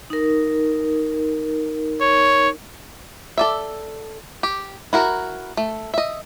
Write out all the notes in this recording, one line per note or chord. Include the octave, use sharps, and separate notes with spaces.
D#4 A#4
C#5
A4 D5 E5
G4
E4 F#4 A#4
A3
D#5 E5